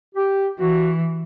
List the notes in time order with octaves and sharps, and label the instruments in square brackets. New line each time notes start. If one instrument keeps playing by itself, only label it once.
[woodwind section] G4
[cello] E3 [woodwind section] F#4